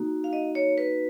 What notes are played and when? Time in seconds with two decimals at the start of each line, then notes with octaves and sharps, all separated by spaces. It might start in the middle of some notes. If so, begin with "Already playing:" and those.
Already playing: A#3 D#4 F#4
0.24 F5
0.33 D#5
0.55 C#5
0.78 B4